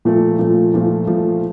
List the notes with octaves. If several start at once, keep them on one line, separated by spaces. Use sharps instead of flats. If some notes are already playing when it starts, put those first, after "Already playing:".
A#2 F3 A3
A#2 F3 A3
A#2 F3 A3
A#2 F3 A3